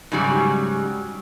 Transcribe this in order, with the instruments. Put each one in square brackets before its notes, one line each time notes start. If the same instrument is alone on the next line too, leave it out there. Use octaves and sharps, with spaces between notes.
[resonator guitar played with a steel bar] G#2 C#3 F#3 G3